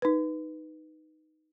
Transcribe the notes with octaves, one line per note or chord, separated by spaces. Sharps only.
D#4 B4